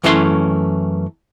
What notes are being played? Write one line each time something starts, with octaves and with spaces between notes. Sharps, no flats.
F#2 E3 A3 C#4 F#4 C6